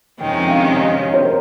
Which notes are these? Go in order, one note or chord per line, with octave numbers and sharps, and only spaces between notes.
F2 C3 D#3 G#3 C#4 G5
G5
F5
D#5
C#5
C5
A#4